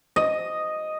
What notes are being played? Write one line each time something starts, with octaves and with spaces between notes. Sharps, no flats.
D#5